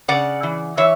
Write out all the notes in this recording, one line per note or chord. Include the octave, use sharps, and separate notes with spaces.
C#3 D5 F#5
E3
E3 C#5 E5